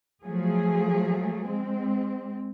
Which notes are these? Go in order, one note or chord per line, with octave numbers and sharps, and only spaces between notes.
F3 F#3 A3 G#4
G#3 C4